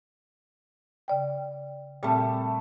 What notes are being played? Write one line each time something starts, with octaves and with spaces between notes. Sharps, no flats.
C#3 D5 G5
A#2 G3 A3 C4 A5